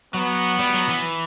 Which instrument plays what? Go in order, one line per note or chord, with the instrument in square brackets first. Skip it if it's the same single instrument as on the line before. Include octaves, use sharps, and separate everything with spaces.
[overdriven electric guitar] F#3 [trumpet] B3
[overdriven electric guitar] G3
F#3
E3